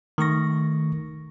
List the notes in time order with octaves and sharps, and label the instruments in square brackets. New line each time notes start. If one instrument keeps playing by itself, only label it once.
[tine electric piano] D#3 A3 C#6 A#6